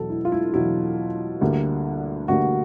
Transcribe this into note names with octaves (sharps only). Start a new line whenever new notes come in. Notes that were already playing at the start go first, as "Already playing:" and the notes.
Already playing: E2 B2 F#3 A4
E4
F4
E4
E2 B2 F#3 E4
D2 D3 G3 A#3
D2 D3 G3 A#3 F#4